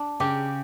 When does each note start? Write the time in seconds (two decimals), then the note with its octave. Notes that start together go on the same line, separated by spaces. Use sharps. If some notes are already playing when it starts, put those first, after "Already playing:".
Already playing: D4
0.20 C#3 G4